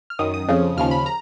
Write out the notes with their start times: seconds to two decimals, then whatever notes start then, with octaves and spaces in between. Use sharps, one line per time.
0.10 F6
0.19 F#2 D#3 D#6
0.34 D#6
0.49 F2 C#3 F3
0.77 D#2 C#3 F3 F6
0.91 B5
1.06 A#5